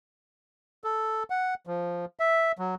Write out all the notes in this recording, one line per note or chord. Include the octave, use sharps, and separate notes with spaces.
A4
F#5
F3
E5
F#3